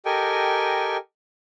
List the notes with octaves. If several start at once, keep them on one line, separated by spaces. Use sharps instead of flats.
G4 A4 A#4 D#5 G5 G#5